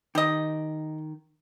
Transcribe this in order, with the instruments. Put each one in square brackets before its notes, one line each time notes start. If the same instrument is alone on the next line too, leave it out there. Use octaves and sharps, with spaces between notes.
[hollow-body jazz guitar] D#3 [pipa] G4 D#5